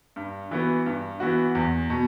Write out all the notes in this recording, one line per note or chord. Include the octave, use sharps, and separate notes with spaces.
G2
E3 B3 F#4
G2
E3 B3 F#4
E2
B2